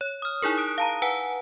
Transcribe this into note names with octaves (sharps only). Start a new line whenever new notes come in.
C#5
D#6 F6
D#4 E4 G#4 A#4
D#6 F#6 D7
F5 A5 A#5
B4 F#5 G#5